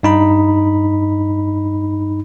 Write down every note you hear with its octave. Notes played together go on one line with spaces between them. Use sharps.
G2 D#4 B5